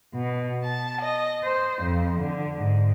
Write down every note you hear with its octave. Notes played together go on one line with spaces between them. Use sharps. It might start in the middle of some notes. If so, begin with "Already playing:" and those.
B2
A5
D#5
C5
F2
D3
G#2